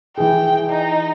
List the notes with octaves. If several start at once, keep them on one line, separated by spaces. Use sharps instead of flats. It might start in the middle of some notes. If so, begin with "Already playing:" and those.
E3 G#4 G5
D#4